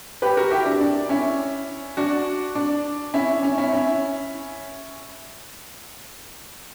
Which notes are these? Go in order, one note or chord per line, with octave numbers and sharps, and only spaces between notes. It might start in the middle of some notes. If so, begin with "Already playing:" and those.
G4 B4
F#4 A#4
E4 G4
D4
D4
C#4 E4
D4 F#4
D4
C#4 E4
C#4
C#4 E4
C#4 E4